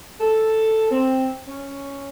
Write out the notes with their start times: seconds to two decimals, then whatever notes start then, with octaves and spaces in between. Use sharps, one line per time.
0.19 A4
0.91 C4
1.47 C#4